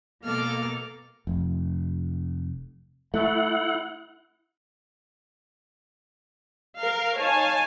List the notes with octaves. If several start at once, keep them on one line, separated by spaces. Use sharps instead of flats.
B2 A#3 A4 D6 F6
F1
A3 E4 F#5
A#4 F5
D#4 C#5 F5 G#5 A5